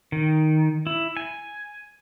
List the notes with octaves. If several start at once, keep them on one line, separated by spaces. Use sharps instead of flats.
D#3
E4
G#5